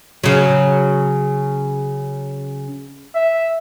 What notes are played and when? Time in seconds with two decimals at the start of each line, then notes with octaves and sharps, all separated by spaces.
0.24 C#3 F#3
3.15 E5